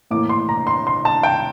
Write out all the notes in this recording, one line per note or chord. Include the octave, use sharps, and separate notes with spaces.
A2 E3 A#3 D6
C6
A#5
C6
C6
A5
G5